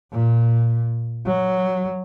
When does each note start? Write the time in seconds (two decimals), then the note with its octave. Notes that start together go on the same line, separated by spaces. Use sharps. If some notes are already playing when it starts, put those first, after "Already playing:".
0.13 A#2
1.26 F#3